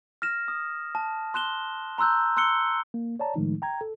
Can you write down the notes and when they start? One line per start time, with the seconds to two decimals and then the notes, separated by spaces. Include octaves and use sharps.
0.22 F6 A#6 E7
0.48 D#6
0.95 A5
1.34 C6 F#6 E7 G7
1.98 A#5 C6 E6 F#6 G6
2.37 C6 E6 F#6 C#7 G7
2.94 A#3
3.20 C#5 D5 A5 A#5
3.36 A2 D#3 F3 G#3 A3 D#4
3.62 G5 A#5 G#6
3.81 A4